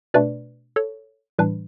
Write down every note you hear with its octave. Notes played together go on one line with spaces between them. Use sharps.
B2 A3 D4 B4 D5
A4 C#5
A2 E3 G3 D4 B4